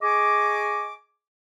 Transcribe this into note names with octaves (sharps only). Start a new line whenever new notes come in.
G#4 D#5 G#5 C#6 D6